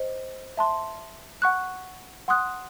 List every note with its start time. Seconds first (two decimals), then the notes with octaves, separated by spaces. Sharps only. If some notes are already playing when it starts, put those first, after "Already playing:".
Already playing: C5 D#5
0.57 E5 A5 C6
1.42 F#5 C#6 F#6
2.28 F#5 C6 D#6 F#6